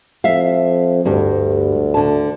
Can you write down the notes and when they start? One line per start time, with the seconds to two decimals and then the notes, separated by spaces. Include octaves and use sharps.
0.24 F2 E5 F5
1.05 D2 G2 G3
1.94 D3 C#5 A5